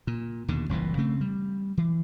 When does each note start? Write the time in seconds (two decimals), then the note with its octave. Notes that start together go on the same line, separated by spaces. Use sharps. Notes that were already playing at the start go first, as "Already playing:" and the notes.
0.07 A#2
0.48 D#2 B2 D3
0.69 F#1 C2 A#2 E3
0.97 C#3 A3 C4
1.21 G3
1.77 E3